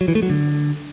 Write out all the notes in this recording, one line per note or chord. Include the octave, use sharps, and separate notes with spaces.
F#3
E3
A3
F#3
D3